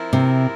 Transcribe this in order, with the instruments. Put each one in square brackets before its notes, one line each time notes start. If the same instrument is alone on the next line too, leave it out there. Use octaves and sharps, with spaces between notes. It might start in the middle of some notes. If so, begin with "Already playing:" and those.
Already playing: [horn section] F3 C4 E4 A#4
[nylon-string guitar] C3